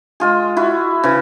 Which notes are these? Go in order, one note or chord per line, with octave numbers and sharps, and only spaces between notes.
G#3 F4 G#4
E4 F#4
C#3 E3